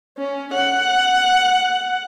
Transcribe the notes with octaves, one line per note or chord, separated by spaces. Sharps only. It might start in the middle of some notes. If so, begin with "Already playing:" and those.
C#4
F#5